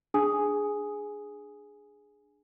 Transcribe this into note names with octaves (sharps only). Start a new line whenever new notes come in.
D4 G#4 G#5 D#6